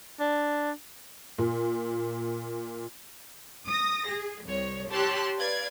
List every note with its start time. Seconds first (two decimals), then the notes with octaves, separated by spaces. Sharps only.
0.20 D4
1.38 A#2
3.66 D#6 A#6
4.06 G#4
4.44 C2 C#5
4.91 G4 C#5 A5 C6 E6 F#6
5.38 B4 D5 F5 G#6